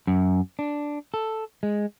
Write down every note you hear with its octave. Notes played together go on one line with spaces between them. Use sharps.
F#2
D4
A4
G#3